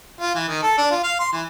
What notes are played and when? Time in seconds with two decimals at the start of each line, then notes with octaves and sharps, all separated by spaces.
0.20 F4
0.35 E3
0.48 D#3
0.63 A4
0.78 D4
0.91 F4
1.03 F5
1.19 C6
1.32 E3